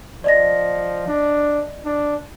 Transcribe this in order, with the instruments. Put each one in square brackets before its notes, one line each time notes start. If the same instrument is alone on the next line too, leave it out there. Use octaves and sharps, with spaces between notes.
[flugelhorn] F3 [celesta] D5 D#5 A#6
[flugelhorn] D4
D4